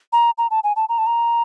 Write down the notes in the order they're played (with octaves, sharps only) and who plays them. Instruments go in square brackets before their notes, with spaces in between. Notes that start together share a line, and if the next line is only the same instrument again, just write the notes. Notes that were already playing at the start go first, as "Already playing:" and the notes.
[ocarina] A#5
A#5
A5
G#5
A5
A#5
A5
A#5